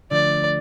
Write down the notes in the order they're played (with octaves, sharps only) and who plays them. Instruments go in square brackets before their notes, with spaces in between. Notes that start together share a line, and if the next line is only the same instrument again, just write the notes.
[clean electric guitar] D2 D3 F3 A3 [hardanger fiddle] D5